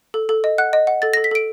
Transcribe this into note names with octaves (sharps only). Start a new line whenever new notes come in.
A4
A4
D#5
F#5 F#6
D#5
F#5
A4 A6
A4 A#6
B6
A4 D7